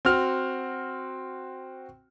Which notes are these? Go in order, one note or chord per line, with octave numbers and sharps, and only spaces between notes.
C4 F#4 F6